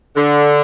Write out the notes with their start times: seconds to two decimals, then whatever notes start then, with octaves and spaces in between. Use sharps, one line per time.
0.16 D3